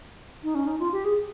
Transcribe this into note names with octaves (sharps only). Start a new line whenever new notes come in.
D#4
C#4
D#4
F4
G4
G#4